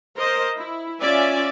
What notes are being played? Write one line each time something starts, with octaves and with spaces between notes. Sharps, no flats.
A#4 C5 D#5
E4
C#4 F4 D5 E5 G#5